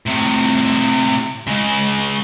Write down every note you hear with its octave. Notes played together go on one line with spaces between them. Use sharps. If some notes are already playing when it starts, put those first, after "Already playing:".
A2 C3
C#3 G#3